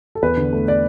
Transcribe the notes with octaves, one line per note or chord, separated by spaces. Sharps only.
A4
E2 B4
D3
A3
D5